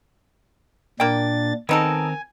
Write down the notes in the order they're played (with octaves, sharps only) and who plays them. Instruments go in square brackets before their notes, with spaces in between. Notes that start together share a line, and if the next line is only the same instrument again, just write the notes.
[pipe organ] A#2 D4 A6 [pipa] A#3 G5
[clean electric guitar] D#3 C4 A#4 [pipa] B3 D#4 A4 [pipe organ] G#5